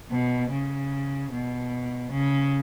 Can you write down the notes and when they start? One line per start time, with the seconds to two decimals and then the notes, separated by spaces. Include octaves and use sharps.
0.11 B2
0.50 C#3
1.31 B2
2.11 C#3